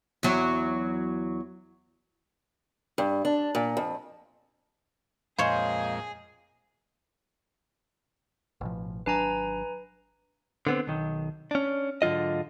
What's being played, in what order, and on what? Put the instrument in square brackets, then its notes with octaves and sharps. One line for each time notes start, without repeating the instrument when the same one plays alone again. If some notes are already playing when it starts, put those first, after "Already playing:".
[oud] E2 F#3
[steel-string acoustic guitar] G2
D4
A#2
F2
[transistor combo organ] F2 A#2 G#3 [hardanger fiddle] G#4 [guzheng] C5 C#5 [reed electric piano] D#5 F5
[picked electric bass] A1 B2 F3
[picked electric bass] G#1 F#3 D4 [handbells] B4 G#5 A#5
[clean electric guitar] D3 B3 C4
B1 D#3
C#4 D4
G#2 D3 F#3 F4 D#5